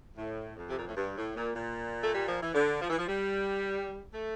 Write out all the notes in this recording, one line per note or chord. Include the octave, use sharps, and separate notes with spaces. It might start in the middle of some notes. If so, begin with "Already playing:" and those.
A2
F2
C3
A#2
A2
G2
A2
A#2
A#2
A3
G3
F3
E3
D3
F3
E3
F3
G3
A3